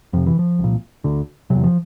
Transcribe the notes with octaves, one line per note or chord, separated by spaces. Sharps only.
F2 C3 F3
E3
F3
C2 A#2
D2 D3
E2 C3 F#3
F3